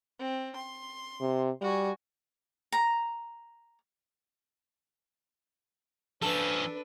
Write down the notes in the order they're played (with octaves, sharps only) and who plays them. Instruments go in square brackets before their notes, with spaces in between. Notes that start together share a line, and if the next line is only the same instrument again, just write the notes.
[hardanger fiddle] C4
C6
[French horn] C3
[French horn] G3 [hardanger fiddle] F#4 G#5
[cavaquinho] A#5
[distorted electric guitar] F3 C#4 [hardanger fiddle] D4 B4 [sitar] A4